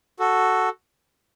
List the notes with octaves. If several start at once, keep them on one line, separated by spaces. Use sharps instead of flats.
F#4 A4